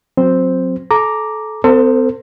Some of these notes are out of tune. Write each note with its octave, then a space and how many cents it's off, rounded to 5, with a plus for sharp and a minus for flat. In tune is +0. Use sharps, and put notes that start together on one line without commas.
F#3 -20 C4 +0 C5 +0
A4 -25 A#5 +0 D6 +0
C4 -40 A4 +40 C5 +0